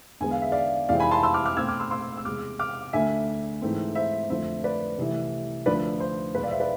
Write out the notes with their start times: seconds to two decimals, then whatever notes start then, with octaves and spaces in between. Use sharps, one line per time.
0.20 E2 D3 G#3 B3 G#5
0.31 F5
0.42 E5
0.52 D5 F5
0.89 F2 C3 E3 G#3 C4 D5 F5
1.00 G#5 B5
1.11 A5 C6
1.23 C6 E6
1.34 D6 F6
1.46 D6 F6
1.57 B2 A3 C4 E6 G#6
1.68 D6 F6
1.80 C6 E6
1.91 C6 E6
2.17 E6
2.25 E2 C3 G#3 D6 F6
2.59 D6 F6
2.93 D2 D3 A3 E5 G#5
3.61 G#2 E3 A3 C4
3.95 C5 E5
4.30 F2 D3 F3 A3 C5 E5
4.64 B4 D5
4.98 C2 C3 E3 A3
5.66 D2 D3 F3 B4 D5
6.00 C5
6.34 E2 B2 G#3 B4
6.43 D5 F5
6.51 C5 E5
6.60 B4 D5